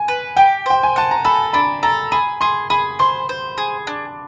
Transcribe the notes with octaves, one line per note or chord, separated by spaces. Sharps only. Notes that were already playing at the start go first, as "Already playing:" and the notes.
Already playing: G#5
B4
G4 G5
C5 G5
G#5
F#5 A5
A#5
A4 B5
D4 B5
A4 A#5
G#4 B5
G#4 C6
G#4 B5
C5 C6
C5
G#4
D4